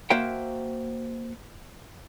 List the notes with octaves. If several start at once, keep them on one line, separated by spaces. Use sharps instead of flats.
A#3 F#4 C5 E5 F5 G5